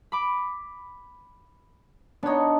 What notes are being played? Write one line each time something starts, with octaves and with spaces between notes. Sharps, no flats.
B5 D6
B3 D4 D#4 C#5